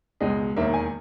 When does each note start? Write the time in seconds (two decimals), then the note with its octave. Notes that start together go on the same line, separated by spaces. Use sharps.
0.20 C#2 B2 G#3 D#5
0.56 E1 D#2 D#3 A#3 E5
0.74 G#5